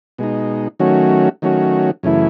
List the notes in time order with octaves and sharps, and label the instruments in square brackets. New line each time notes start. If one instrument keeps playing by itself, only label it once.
[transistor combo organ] B2 G#3 D#4
D#3 F#3 A3 C#4 F#4
D#3 F#3 A3 C#4 F#4
F#2 C#3 E3 A3 E4